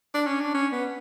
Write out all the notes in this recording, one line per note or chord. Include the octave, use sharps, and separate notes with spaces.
D4
C#4
D4
C#4
B3